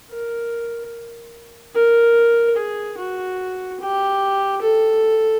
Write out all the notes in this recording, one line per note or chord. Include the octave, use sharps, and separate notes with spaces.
A#4
A#4
G#4
F#4
G4
A4